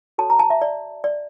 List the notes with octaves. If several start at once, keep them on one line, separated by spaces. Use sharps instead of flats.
F#4 A4 C#5 A5
A#5
A5
E5
D5
D5